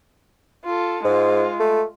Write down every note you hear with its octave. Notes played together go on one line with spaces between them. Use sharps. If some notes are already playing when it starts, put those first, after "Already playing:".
F4 A4
G#2 G#3 F4
A3